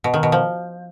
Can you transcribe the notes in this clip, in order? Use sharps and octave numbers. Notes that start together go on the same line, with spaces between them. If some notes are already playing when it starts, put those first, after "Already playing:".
B2
D#3
B2
F3